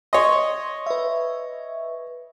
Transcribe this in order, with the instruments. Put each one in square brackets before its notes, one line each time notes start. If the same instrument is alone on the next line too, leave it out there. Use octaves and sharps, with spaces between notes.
[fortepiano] C#5 D#5 [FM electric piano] C6
[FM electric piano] B4 E5